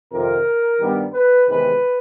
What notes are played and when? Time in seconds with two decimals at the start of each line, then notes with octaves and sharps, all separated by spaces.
0.12 F2 C3 D#3 A#4
0.79 G2 D#3 G3 B3
1.13 B4
1.47 E2 C3 D#3 G#3 B4